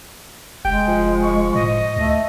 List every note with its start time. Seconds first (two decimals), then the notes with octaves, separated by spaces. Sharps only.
0.65 F1 G#3 G5
0.88 F3
1.22 C#6
1.54 A2 D#5
1.96 D2 A3